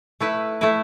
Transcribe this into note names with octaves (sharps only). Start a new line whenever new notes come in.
A3 E4 B4
A3 E4 B4